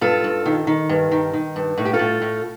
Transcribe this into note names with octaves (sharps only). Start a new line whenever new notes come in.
G2 F4 A4
G2
D#3
D#3
G2
D#3
D#3
G2
A2 A4
G4
F4 A4
A2
A2